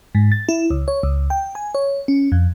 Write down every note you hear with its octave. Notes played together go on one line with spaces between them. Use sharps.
G#2
A6
E4
C#2
C#5
C#2
G5
G#5
C#5
C#4
F2